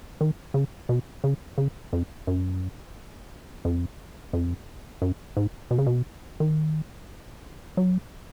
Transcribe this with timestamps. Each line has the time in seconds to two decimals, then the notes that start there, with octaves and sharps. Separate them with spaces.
0.21 D#3
0.54 C#3
0.89 B2
1.24 C#3
1.58 C#3
1.93 F2
2.27 F#2
3.65 F2
4.33 F2
5.02 F#2
5.37 G#2
5.71 B2
5.78 C#3
5.86 B2
6.40 D#3
7.77 F#3